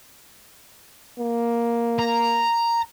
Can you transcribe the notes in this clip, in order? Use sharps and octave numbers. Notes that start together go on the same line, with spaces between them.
A#3
A#5